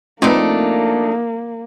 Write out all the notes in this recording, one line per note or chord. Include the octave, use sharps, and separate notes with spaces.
F3 A3 A#3 C4 D4 D#4 B4